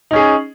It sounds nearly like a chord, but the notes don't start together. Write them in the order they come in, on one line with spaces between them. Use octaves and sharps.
D#4 C#4 G#4